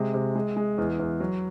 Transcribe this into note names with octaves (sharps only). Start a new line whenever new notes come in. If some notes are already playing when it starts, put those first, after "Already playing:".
Already playing: C3 G#3
C3
G#3
G#3
E2
E2
F#3